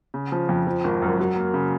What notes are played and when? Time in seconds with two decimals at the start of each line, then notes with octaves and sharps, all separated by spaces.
0.14 C#3
0.32 F3
0.49 F2
0.67 F3
0.84 G#1
1.02 F#2
1.20 F#3
1.36 A#3
1.54 C#3